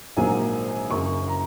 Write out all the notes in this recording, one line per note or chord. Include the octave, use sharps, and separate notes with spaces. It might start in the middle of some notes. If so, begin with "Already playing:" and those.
A#1 G#2 F#3 A#3 G#5
F#1 F#2 C#3 C#6
A#5